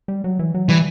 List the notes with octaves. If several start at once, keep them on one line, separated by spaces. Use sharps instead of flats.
G3
F#3
E3
F#3
E3 G3